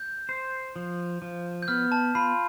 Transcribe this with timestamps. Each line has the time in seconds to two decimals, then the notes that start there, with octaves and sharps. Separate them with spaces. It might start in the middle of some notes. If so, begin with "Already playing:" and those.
Already playing: G6
0.29 C5
0.76 F3
1.22 F3
1.62 G6
1.68 B3 F6
1.92 A5
2.15 F4 B5